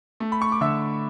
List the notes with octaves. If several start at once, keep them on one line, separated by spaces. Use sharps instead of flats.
A3
B5
C#6
D6
D3 E5 E6